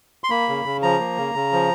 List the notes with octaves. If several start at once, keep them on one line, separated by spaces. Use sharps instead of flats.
C6
A#3 B5
C#3
C#3
F3 A#5
A#3
C#3
C#3
F3